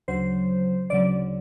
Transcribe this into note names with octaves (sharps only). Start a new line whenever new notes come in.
D2 C#3 F#3 C5
D2 C#3 F#3 D5